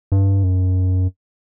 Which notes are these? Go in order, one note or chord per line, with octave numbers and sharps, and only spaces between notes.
G2
F#2